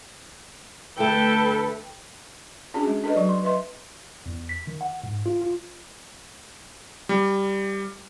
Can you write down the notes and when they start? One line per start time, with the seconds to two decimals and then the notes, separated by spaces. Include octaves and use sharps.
0.98 D2 G2 A3 A4 B4 G5
2.74 C#4 D4 F#4 G#4
2.87 G#3
3.04 D4 A4 B4 D#5
3.16 F#3 F#4 C#6
3.29 C6
3.43 B4 D#5 E5 C6
4.26 E2
4.49 B6
4.67 D#3
4.81 F#5
5.03 G#2
5.26 F4
5.41 F4
7.09 G3